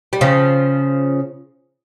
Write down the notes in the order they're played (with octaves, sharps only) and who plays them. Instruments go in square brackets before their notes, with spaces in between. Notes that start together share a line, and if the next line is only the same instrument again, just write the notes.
[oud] G3
C#3 F3